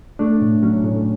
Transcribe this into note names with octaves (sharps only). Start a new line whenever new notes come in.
A3 D4
A2
F#3 C#4
A2